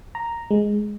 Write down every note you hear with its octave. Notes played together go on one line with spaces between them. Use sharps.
A#5
G#3